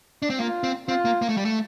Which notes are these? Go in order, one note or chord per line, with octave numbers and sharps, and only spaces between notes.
D4
C4
A#3 F4
C4
C4 F4
A#3
A#3
A3
G3
A3